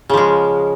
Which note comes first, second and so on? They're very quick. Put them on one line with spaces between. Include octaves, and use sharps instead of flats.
C#3 F3 G#3